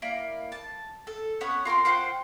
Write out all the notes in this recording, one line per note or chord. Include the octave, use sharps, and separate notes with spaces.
A#3 E4 D5
A5
A4
B3 C#4 C#5 F#5
F4 A#4 G5 C6
F4 C5 F#5 G5